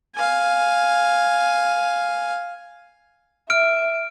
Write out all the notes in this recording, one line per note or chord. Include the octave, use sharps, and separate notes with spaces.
F5 G#5
E5 F6 D7